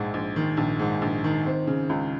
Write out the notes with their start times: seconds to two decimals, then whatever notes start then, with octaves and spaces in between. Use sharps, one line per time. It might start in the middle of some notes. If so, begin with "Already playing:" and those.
Already playing: A#1 G#2
0.14 A#1
0.36 D#3
0.57 A#1
0.79 G#2
1.02 A#1
1.24 D#3
1.46 C4
1.67 C#3
1.89 C#2